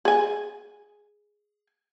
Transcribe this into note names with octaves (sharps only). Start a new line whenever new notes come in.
G#4 G#5